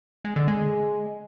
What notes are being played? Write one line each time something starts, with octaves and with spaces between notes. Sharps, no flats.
G#3
D3
G#3